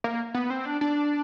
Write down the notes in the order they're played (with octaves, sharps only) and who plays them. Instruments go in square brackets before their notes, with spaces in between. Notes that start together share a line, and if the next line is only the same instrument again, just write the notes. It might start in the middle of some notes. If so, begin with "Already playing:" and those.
[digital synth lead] A#3
B3
C4
D4
D4